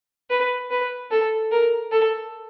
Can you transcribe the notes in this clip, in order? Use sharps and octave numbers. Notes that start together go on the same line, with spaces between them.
B4
B4
A4
A#4
A4